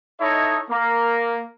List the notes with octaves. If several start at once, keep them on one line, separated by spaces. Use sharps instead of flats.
D#4 E4 A4 C#5 D#5 E5
A#3